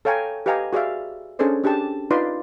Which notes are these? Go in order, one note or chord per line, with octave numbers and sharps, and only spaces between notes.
A4 C#5 F5 G5 G#5 A#5
G4 B4 D#5 F5 G#5 A#5
F#4 G#4 D5 E5 F5
C#4 D4 G#4 A4 C5 D5
D4 G4 G#4 A5
D#4 F4 B4 D5 C6 D6